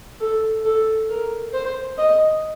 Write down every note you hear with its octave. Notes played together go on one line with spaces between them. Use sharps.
A4
A4
A#4
C5
D#5